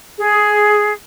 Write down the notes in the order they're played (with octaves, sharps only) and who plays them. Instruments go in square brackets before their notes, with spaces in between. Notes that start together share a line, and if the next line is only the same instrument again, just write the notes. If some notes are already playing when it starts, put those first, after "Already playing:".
[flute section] G#4